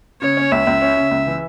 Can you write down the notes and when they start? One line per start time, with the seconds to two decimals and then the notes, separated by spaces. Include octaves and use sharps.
0.21 C#3 C#5
0.37 C#4
0.52 C#2 E5
0.67 C#2
0.82 C#4
0.97 C#3
1.11 C#2
1.27 E3